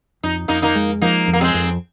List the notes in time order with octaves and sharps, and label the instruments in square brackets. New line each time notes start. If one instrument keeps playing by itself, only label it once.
[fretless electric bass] F2 [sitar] D#4
[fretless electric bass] F2 [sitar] A#3 D#4
[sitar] A#3 D#4
[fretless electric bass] G#3
[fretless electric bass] F3 [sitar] A#3 D#4
[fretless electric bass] F2
[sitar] A#3
G#3 C4
[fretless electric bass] F2